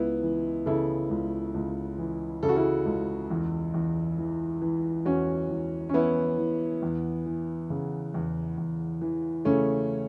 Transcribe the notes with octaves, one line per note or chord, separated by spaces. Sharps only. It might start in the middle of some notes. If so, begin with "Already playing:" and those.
Already playing: C#2 B3 E4
E3
C#3 E4 A4
C#2
C#2
E3
C#3 A4
F#4
E4 A4
C#2
E2
E2
E3
E3
E2 C#4 F#4
E2
C#4
E3 B3 E4
E3
E2
E3
C#3
E2
E2
E3
C#3 A3 C#4